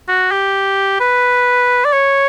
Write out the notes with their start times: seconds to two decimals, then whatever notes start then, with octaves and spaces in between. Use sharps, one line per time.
0.08 F#4
0.32 G4
1.00 B4
1.85 D5
1.93 C#5